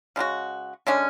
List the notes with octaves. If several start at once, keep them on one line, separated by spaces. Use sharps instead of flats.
C#3 G#3 D4 F#4
D3 G#3 C#4